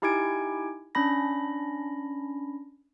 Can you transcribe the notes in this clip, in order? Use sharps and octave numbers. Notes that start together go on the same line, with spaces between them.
D#4 E4 G4 G#5 G#6 D7
C#4 D4 B5 A#6